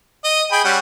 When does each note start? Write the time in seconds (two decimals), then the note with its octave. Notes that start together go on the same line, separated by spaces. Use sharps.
0.24 D#5
0.52 G#4 G5 B5
0.65 G3 C#4 F#5